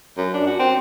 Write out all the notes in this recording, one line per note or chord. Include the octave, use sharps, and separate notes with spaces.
F#2
D4
F#4
C4